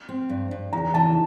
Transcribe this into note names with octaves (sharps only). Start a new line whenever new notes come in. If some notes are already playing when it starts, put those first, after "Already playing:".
C4
G2
G2
E2 A#5
E3 A5